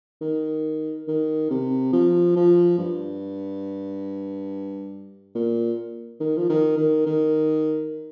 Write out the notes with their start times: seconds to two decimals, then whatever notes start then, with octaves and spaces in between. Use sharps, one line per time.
0.21 D#3
1.08 D#3
1.50 C3
1.93 F3
2.36 F3
2.78 G2
5.35 A#2
6.20 D#3
6.37 F3
6.49 D#3
6.77 D#3
7.06 D#3